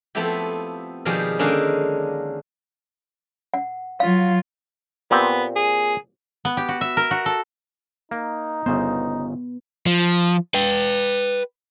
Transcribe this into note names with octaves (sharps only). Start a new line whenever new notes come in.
F3 A3 B3 C4 E4 G4
B2 D#3 F3 G3 G4 G#4
D3 D#3 G#3 A#3 C#4 D4
F#5
F#3 F4 F5
A#2 B3 C4 G4
G#4
B3
G4
F#4
E5
A#4
F#4
A4
A#3 D#4
G1 C#3 B3 C5
F3
B4 G5